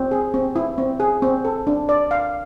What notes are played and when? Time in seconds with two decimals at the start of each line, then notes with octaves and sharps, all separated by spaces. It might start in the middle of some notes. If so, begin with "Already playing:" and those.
Already playing: C4
0.11 G#4
0.34 C4
0.56 E4
0.78 C4
1.00 G#4
1.22 C4
1.45 A4
1.67 D4
1.89 D5
2.11 F5